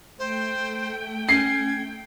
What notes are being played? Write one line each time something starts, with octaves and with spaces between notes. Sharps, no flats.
A3 C5 G5
C#4 G#6 C7